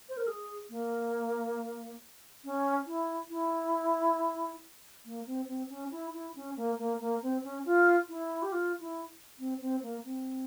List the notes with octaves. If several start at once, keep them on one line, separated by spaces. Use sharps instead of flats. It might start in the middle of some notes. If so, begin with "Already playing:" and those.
C5
A#4
G#4
A#3
C#4
E4
E4
A#3
C4
C4
C#4
E4
E4
C#4
A#3
A#3
A#3
C4
C#4
F4
E4
G4
F4
E4
C4
C4
A#3
C4